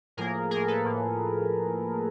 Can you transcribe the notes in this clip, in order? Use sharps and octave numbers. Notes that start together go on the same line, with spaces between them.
A2 F3 A#3 G#4 A#4
A2 F3 A#3 G#4 A#4
A4 B4
A2 F3 A#3